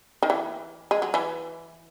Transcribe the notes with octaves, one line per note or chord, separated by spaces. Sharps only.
D#3
E3
G#3
F#3
E3